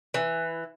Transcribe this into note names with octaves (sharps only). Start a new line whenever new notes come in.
E3